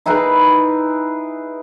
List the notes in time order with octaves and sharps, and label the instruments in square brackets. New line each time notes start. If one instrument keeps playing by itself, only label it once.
[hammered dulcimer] D#4 E4 G#4 B4